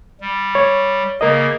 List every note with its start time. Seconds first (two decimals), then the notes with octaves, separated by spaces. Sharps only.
0.21 G3
0.55 C#5
1.21 C#3 A#3 A#4 D#5